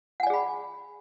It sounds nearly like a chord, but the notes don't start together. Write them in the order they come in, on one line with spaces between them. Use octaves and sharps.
F#5 G#5 D5 G#4 B5